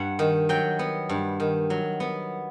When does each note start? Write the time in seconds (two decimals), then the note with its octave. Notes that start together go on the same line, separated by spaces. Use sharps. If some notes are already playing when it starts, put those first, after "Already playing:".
Already playing: G2 F#5
0.19 D#3
0.49 F#3 G5
0.79 B3
1.09 G2
1.40 D#3
1.70 F#3
2.00 B3